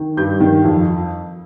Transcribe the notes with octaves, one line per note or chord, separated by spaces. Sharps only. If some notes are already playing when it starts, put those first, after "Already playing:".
Already playing: D#3
G2 G6
D#3
F2